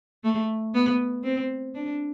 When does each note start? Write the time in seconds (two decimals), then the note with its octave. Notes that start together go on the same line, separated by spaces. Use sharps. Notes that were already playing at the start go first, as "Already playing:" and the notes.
0.24 A3
0.74 B3
1.24 C4
1.74 D4